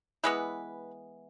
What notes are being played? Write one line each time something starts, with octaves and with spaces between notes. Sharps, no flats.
E3 G#3 B3 B4